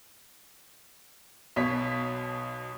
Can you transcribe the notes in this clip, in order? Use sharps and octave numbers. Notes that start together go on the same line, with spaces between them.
B1 B2 C#5 B6